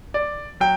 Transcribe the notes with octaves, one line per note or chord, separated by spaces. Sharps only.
D5
F#3 G5